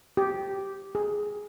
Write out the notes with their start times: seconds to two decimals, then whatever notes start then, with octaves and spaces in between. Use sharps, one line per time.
0.17 G4
0.95 G#4